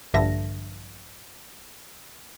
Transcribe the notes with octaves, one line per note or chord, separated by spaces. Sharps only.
A#1 G2 D3 E5 A5 A#6